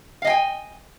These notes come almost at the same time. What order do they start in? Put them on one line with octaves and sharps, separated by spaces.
F5 D#5 G#5 G5